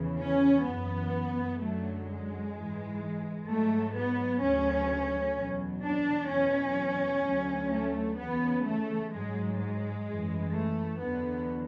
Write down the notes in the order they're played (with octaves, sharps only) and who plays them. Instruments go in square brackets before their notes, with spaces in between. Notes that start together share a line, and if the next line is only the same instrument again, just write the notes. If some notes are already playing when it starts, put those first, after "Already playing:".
Already playing: [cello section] E2 C#3 E3
C#4
F#2 E3 B3
F#2 D3 F#3 A3
G#3
G#2 E3
G#2 F#3 A3
B3
D2 C#3 F#3 C#4
E2 B2 F#3
D4
E2 B2 F#3 C#4
D2 D3 F#3
A3
E2 C#3 E3 B3
A3
G#2 F#3 G#3
G#3
F#2 E3
A3
E2 D3 F#3 B3